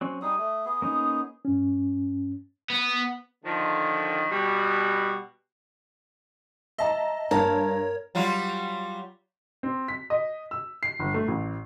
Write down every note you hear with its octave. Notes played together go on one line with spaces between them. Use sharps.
F#3 C4 C#4
G3 D#4 G#4 D#6
A3
B3 G#4
A#3 C#4 D#4
G2 C#4
B3
D3 D#3 F3
B2 G3 F#4
D#5 E5 A5 A#5
G2 A#3 A#4 C#5 A5
F#3 G3 F4
C4
B6
D#5
E6
C7
G1
A3
A1